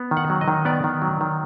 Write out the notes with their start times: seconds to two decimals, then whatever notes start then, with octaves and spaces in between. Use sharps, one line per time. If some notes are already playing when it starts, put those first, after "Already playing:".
Already playing: B3
0.11 D#3
0.17 F#5
0.30 F#3
0.41 D#5
0.48 D#3
0.65 B3 D5
0.84 D#3
1.02 F#3
1.21 D#3